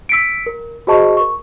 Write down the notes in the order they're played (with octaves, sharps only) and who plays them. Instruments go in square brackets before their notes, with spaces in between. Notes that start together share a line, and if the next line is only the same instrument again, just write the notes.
[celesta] E6 B6 C#7 D7
A#4
F#4 G#4 C5 D#5 A5 C#6
A#4 C#6